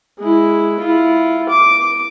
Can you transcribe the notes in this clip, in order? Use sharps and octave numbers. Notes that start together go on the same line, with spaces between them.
G#3 E4
E4 F4
D6